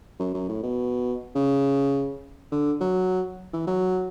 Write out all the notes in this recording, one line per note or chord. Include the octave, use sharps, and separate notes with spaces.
F#2
F#2
A2
B2
C#3
D3
F#3
E3
F#3